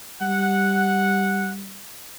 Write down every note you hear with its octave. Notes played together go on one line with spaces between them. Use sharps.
G3 F#5